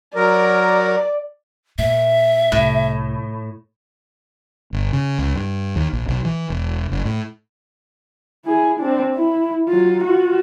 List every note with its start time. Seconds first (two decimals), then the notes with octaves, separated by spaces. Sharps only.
0.15 F#3 A#4 D5
1.78 A#2 E5
2.52 C2 A2
4.73 G1
4.93 C#3
5.18 C#2
5.34 G2
5.76 D#2
5.93 A#1
6.08 B1
6.25 E3
6.50 E1
6.91 F#1
7.05 A2
8.46 E4 G#4
8.79 C4 D4
9.15 E4
9.68 F#3 F4
10.04 F4 F#4